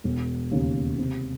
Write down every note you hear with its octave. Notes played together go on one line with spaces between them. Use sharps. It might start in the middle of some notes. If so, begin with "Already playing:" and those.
E1
D#2 C#3
C3